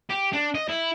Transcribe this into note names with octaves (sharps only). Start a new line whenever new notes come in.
G4
D4
D#5
E4